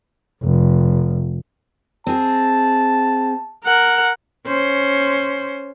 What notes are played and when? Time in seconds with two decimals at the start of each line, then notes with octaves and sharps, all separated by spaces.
0.42 F1
2.07 C4 G#4 A5
3.64 A#4 F#5
4.46 C#4 C5